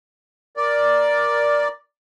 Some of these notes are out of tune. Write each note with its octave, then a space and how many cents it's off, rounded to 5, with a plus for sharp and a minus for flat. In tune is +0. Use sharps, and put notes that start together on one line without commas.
A#4 +10 D5 +0